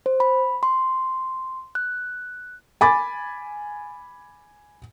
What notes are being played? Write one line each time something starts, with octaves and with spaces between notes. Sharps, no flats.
C5
B5
C6
F#6
G#5 B5 D6 A6